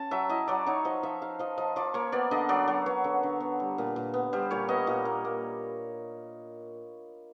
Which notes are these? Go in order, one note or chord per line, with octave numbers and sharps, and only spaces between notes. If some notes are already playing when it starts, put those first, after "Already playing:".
Already playing: C#4 A5
F#3 E5
E4 D#5
F#3 D5
D#4 C#5
F3 D#5
F3 E5
D#4 F5
F3 D#5
F3 D#5
F3 D5
A#3 C#5
B3 D5
D3 D#5
F#3 D5
F#3 C#5
B3 C#5
D3
D3
B3
G3
A#2
A#2
B3
G3 C5
A#2 C#5
B3 D#5
A#2 D#5
A#3
A#3